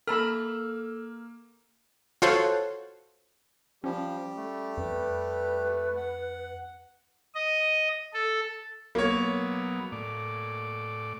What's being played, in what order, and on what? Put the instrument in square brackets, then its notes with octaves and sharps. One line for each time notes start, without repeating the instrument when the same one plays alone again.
[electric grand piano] A#3 E6 F6 [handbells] A4 [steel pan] A#4 A5 B5
[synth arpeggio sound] F4 F#4 A4 C5 C#5 F#5
[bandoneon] F3 [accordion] G3 G4 [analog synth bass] C#4
[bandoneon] A3
[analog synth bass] F2 [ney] B4
[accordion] F#5
[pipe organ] D#5
A4
[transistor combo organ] F#3 B3 [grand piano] A#3 C#5
[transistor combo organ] A2 D5